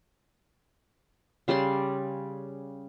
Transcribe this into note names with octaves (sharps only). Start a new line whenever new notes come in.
C#3 G3 D5 C6